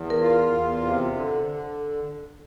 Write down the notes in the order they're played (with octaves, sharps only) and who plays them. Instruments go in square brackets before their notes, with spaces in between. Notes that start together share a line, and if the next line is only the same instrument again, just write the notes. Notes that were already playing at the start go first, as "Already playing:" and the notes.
Already playing: [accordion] E2
[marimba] A#4
[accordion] F4
E2
C3
D3
D3